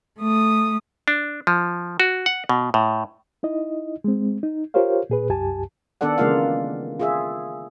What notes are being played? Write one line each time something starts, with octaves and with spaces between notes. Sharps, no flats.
A3 D#6
D4
F3
F#4
F#5
B2
A2
D#4 E4 D#5
G#3 C4
D#4
F4 G4 A#4 C5 C#5 F5
A#2 G#4 B4
C2 F#2 G4 G#5 A5
D#3 B3 D4 A4 D5 F#5
C#3 E3 G#3 A#3 F4 F5
F4 G#4 E5